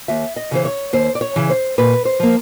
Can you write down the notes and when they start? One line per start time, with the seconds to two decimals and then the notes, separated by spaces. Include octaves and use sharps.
0.08 D#2 E5
0.36 D#5
0.51 C#3 E3 C5
0.65 C#5
0.93 D#2 C5
1.15 D5
1.21 C#5
1.36 C#3 E3
1.50 C5
1.78 A#2 B4
2.05 C5
2.20 F3 A#3